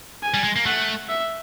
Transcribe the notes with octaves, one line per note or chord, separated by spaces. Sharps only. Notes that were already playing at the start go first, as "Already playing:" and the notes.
G#5
G3
G#3
A#3
A3 F#5
E5